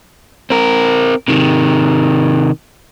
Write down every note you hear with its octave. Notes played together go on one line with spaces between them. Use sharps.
C4 A#4
C3 D#3